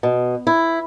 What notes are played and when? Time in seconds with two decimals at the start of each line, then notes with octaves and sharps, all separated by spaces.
0.03 B2
0.47 E4